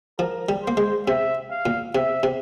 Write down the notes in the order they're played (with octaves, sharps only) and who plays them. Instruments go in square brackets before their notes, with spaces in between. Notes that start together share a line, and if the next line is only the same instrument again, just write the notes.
[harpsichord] F3 [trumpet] A#4
[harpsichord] G3
[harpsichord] A#3 [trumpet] C5
[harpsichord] G#3
[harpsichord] C3 [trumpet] E5
[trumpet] F5
[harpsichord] A#2
[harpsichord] C3 [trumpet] E5
[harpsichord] C3